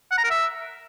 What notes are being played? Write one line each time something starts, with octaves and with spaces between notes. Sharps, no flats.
F#5
A#5
A#4
E5